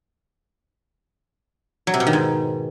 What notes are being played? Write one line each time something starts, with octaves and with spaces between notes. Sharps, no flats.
F#3
C3
B2
D#3
G#2